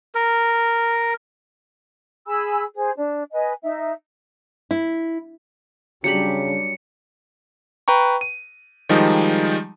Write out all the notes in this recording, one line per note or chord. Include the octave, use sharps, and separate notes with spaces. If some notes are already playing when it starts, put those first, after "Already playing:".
A#4
G#4 G#5 B5 E6
G#4 C5
D4
B4 D#5 G#5
D#4 E5
E4
C#3 F#3 G3 D4 G4 B5 C#7
B4 G5 A#5 C#6
D#7
D#3 F3 G3 G#3 D#4